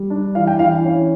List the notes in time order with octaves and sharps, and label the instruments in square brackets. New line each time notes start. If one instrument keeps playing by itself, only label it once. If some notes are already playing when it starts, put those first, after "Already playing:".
Already playing: [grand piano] G3
D4
E3 F5
G5
E3 F5
C#4